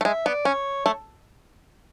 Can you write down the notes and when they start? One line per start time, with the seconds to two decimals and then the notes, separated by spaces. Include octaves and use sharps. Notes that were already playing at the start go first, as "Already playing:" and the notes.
0.01 A3
0.05 G#3 E5
0.26 B3 D5
0.45 C#4 C#5
0.85 A3 C#5